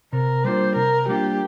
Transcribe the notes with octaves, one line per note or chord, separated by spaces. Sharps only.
C3 A#4
G3 A#3 D4 F4 C5
C3 A#4
G3 A#3 D4 F4 G4